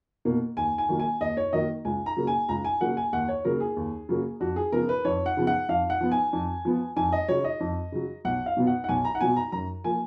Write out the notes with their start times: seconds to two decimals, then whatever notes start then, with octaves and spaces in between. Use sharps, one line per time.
0.25 B2 A#3
0.57 D#2 G#5
0.78 G#5
0.89 D#3 F#3 A#3
1.00 G#5
1.21 D#2 D#5
1.37 C#5
1.53 D#3 F#3 A#3 D#5
1.85 C#2 G#5
2.06 A#5
2.17 C#3 F#3 A#3
2.27 G#5
2.49 C#2 A#5
2.65 G#5
2.81 C#3 F#3 A#3 F#5
2.97 G#5
3.13 D#2 F#5
3.28 C#5
3.45 C#3 F#3 A#3 A#4
3.60 G#4
3.76 D#2
4.09 C#3 F#3 A#3
4.40 F2 F#4
4.56 G#4
4.72 C#3 F3 B3 A#4
4.89 B4
5.05 F2 C#5
5.26 F#5
5.37 C#3 F3 B3
5.47 F#5
5.69 F2 F5
5.90 F#5
6.01 F3 B3
6.11 G#5
6.33 F2
6.65 F3 B3
6.96 F2 G#5
7.12 D#5
7.28 C#3 F#3 C#5
7.44 D#5
7.60 F2
7.92 C#3 F#3
8.25 B1 F#5
8.46 F5
8.57 B2 F#3 B3
8.67 F#5
8.84 F#5
8.89 B1 G#5
9.05 A#5
9.15 F#5
9.21 B2 F#3 B3 G#5
9.36 A#5
9.52 F#2 A#5
9.84 F3 A#3 G#5